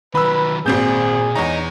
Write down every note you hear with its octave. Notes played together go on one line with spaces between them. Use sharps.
D#3 F#3 B4 B5 E6
G#1 A#2 C4 G#4 G6
E2 D#4 C#5 A#5